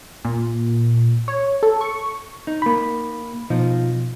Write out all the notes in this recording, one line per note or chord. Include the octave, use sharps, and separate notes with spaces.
A#2
C#5
A4
C#6
D#4
A#3 B5
B2 F3 D#4